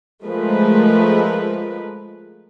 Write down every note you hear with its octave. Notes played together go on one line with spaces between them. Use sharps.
F3 G#3 A3 A#4 B4